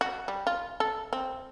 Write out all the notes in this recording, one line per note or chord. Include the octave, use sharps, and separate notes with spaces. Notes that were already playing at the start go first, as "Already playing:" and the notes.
F#4
G3
F4
A4
C4